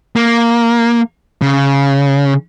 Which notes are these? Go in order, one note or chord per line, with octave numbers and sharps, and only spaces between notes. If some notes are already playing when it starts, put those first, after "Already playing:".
A#3
C#3